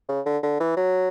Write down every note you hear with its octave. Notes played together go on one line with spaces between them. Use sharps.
C#3
D3
D3
E3
F#3